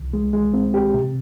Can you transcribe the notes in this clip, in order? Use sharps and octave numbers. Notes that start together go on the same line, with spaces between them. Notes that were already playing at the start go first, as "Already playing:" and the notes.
Already playing: C2
G#3
G#3
C4
G4
C3